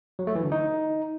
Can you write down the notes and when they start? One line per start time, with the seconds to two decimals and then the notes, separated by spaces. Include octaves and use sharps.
0.19 F#3
0.27 A3
0.35 E3
0.44 D3
0.52 D#4